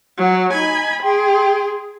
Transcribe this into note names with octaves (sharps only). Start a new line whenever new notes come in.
F#3 F#5
D#4 G#5 B5
G#4 G5 C6